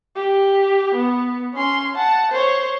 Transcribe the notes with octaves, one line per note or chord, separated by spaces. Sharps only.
G4
B3
C#4 C6
F#5 A5
C5 C#5